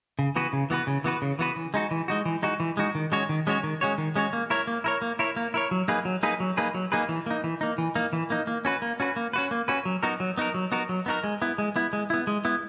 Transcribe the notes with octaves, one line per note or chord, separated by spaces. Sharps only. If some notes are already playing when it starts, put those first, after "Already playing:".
C#3
E3 B3 F#4 B4
C#3
E3 B3 F#4 B4
C#3
E3 B3 F#4 B4
C#3
E3 B3 F#4 B4
E3
G#3 D#4 F#4
E3
G#3 D#4 F#4
E3
G#3 D#4 F#4
E3
G#3 D#4 F#4
D#3
G#3 C#4 F#4 C#5
D#3
G#3 C#4 F#4 C#5
D#3
G#3 C#4 F#4 C#5
D#3
G#3 C#4 F#4 C#5
A#3
E4 A#4 C#5
A#3
E4 A#4 C#5
A#3
E4 A#4 C#5
A#3
E4 A#4 C#5
F#3
A#3 D#4 G#4 B4
F#3
A#3 D#4 G#4 B4
F#3
A#3 D#4 G#4 B4
F#3
A#3 D#4 G#4 B4
E3
A#3 D#4
E3
A#3 D#4
E3
A#3 D#4
E3
A#3 D#4
A#3
C#4 F#4 B4
A#3
C#4 F#4 B4
A#3
C#4 F#4 B4
A#3
C#4 F#4 B4
F#3
B3 D#4 F#4 A#4
F#3
B3 D#4 F#4 A#4
F#3
B3 D#4 F#4 A#4
F#3
B3 D#4 F#4 A#4
G#3
B3 E4
G#3
B3 E4
G#3
B3 E4
G#3
B3 E4